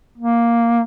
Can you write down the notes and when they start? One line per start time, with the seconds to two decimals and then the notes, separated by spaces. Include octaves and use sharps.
0.18 A#3